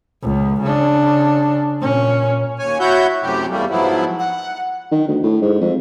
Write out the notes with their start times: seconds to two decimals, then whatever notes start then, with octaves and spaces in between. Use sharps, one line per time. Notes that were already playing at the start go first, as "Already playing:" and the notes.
0.23 C#2
0.62 C#3 D4
1.81 A#2 C#4
2.59 D#2 C#5 G#5
2.80 E4 F#4 C#5 E5 F#5 G6
3.23 F#2 A2 C3 G4
3.50 E2 G3 A3 A#3
3.70 G#2 F3 F#3 B3 E4
4.19 F#5
4.92 D#3
5.08 D2
5.23 A2
5.42 G#2
5.61 F2